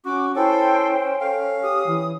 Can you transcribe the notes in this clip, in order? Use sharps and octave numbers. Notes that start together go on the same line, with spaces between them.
C#4 F#4 D6
C#4 E4 A4 C5 G5
A4 F5
G4 D#6
E3